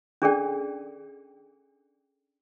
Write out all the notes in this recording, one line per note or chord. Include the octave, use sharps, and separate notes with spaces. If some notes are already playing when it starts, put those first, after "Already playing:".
C#4 D4 G#4 A4 D5 G5